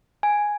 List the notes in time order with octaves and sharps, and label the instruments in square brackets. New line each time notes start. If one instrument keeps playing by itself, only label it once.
[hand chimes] G#5